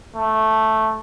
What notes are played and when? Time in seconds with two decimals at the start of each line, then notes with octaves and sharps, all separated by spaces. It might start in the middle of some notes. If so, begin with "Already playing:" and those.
0.15 A3